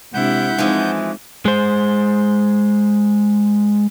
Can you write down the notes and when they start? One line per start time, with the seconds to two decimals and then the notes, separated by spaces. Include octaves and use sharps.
0.14 C3 G#3 D4 E4 F#5 G6
0.58 E3 F3 G#3 C4 D#4
1.45 G#3 C5